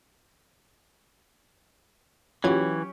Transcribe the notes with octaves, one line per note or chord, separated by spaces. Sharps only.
E3 F#3 C#4 F4 G4 G#6